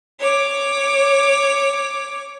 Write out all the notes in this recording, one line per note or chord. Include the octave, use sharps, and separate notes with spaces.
C#5 D6